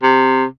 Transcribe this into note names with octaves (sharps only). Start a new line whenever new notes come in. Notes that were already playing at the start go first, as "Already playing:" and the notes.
C3